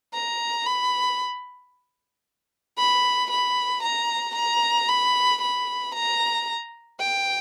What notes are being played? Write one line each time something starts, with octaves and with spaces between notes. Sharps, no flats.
A#5
B5
B5
B5
A#5
A#5
B5
B5
A#5
G5